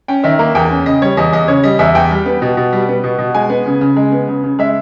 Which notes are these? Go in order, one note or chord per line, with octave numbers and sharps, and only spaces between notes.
C#4 G5
D#3 E5
A#3
E2 G5
C#4
C#3 D#5
G3 C#5
E2 D#5
E2 D#5
C#3 C#5
G3 D#5
E2 E5
E2 G5
G3
B3
B2
B2
G3
B3
B2
B2
G#3 G#5
B3
C#3
C#3
G#3
B3
C#3
C#3
G#3 E5